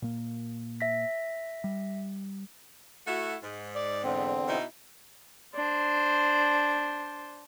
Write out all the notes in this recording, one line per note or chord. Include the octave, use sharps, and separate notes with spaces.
A#2 A#3
E5 A#6 B6
G3
A3 E4 F#4
G#2
D5
E2 D3 C4
B2 D#4 E4
D4 C5